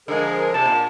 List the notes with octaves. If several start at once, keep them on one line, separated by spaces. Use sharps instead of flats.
D3 F3 G#3 G#4 A#4
C3 A5
A#2 A#3